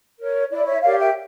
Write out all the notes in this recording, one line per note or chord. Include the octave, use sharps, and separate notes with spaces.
A#4 C#5
E4 D5
C#5 E5
G4 A#4 C#5 D5 F5
E5 G5